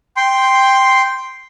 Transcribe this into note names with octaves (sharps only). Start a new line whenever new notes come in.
G5 C6